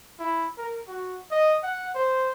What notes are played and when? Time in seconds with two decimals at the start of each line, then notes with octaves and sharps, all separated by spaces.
0.19 E4
0.58 A#4
0.88 F#4
1.31 D#5
1.63 F#5
1.95 C5